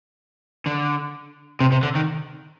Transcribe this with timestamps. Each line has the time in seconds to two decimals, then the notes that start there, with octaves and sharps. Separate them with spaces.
0.66 D3
1.60 C3
1.72 C3
1.83 D3
1.95 D#3